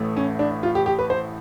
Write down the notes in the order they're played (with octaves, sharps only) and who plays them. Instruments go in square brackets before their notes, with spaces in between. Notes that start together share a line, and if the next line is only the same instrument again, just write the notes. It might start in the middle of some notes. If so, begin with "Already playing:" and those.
Already playing: [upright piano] A1 A2 E3 A3
C#4
D4
F4
G4
G4
B4
C5